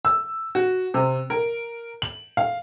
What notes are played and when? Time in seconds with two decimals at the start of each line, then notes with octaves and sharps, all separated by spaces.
0.05 E6
0.55 F#4
0.94 C3
1.30 A#4
2.02 F#7
2.37 F5